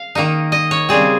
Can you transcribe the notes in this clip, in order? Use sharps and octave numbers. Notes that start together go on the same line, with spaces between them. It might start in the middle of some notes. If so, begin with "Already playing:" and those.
Already playing: F5
D#3 A#3 D#4
D#5
C#5
C#3 G3 C4 G#4